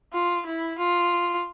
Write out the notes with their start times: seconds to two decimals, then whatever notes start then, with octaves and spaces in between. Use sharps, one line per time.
0.13 F4
0.46 E4
0.78 F4